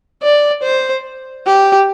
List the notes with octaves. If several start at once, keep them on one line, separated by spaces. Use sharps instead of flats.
D5
C5
G4